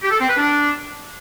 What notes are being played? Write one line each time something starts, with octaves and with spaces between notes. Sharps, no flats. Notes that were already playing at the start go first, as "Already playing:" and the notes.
G4
A4
C4
B4
D4